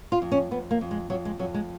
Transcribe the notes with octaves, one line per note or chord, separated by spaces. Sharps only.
F4
F2
C#4
F2 B3
A#3
F2
G#3
F2 F#3
G#3
F2 F#3
G#3